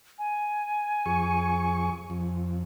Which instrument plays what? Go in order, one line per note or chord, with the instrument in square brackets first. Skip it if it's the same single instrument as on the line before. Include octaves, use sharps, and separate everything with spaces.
[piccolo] G#5
[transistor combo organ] F2 G#4 C#6
F2